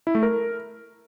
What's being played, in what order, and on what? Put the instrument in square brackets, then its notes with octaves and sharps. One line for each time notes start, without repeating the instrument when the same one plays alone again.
[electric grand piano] E4
A3
A#4